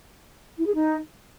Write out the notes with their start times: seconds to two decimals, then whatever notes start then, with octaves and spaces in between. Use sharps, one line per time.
0.59 E4
0.66 G#4
0.74 D#4